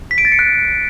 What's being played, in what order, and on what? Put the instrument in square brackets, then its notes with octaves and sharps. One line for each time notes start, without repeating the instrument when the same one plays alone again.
[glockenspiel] B6
D7
A6
C#7
F#6